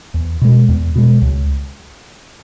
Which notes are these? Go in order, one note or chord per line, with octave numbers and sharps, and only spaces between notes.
E2
B2 G#3
E2
B2 G#3
C#2